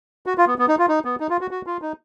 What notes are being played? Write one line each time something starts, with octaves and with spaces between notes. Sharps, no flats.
F#4
F4
B3
B3
D#4
F4
D#4
B3
D#4
F4
F#4
F#4
F4
D#4